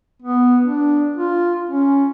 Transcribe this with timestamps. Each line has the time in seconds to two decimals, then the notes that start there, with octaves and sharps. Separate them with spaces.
0.22 B3
0.63 D4
1.16 F4
1.70 C#4